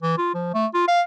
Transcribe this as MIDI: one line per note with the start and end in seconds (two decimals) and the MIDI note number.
0.03 0.16 52
0.18 0.33 65
0.34 0.53 53
0.54 0.66 57
0.74 0.88 65
0.88 1.02 77